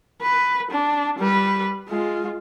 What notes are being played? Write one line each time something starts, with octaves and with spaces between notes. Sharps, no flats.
B4
D4
G3 B4
G#3 F4